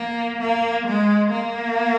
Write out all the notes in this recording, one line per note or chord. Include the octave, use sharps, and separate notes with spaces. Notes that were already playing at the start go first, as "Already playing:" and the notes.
Already playing: A#3
A#3
G#3
A#3